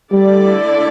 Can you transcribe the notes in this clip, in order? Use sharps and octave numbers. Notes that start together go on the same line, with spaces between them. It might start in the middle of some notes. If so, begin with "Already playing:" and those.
D3 G3 A3 E4 A4 D5